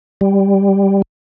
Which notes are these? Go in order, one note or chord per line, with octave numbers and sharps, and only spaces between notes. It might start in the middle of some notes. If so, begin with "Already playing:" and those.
G3